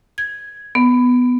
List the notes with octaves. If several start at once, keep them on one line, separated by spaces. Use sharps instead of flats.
G#6
B3